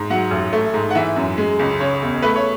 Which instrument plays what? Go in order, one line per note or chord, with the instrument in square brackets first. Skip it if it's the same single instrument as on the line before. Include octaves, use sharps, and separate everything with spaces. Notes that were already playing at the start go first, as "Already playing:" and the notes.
Already playing: [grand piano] G#2
F#3 F#5
A1
A3
G#2
F#5
E3 E5
F#2
G#3
C#2
C#3 C#5
E1
A3 B4
C#5